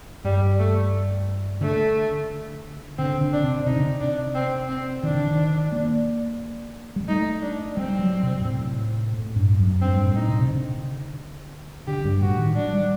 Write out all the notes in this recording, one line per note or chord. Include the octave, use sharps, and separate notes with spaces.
G2 G3
A3
D3 A3
D3 C4
D3
D4
C3
C3 D#4
D3
C3
D4
C4
C4
D#3 D4
D3
D#3
A#3
G3
A3 D#4
D4
G3 C4
F#3
C3
G2
A2
A2
G2
F#2
G2 C4
G2
A2
D#4
C3
C3
D3
D3 G4
G2
A2 F#4
D#3
G3 D4
G3